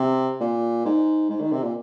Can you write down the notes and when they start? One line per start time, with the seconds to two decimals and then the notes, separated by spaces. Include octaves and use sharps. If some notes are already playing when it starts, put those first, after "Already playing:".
Already playing: C3
0.40 A#2
0.85 G#2
1.30 G#2
1.41 D#3
1.52 C3
1.63 A#2